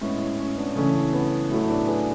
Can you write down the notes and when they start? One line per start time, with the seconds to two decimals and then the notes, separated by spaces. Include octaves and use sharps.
0.01 A2 G#3 B3 C#4 E4
0.19 C#4
0.39 C#4
0.57 B3 D4
0.75 C#3 E3 A3 C#4
1.13 B3
1.50 A2 F#3 A3
1.69 B3 D4
1.87 G#4 B4